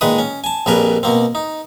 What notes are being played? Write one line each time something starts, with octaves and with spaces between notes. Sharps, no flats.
A#2 D#3 G#3 B4 D#6
C#4
G#5 A5
A#1 F2 G3 A#4 B4 G#5
B2 A#3 C4
D#4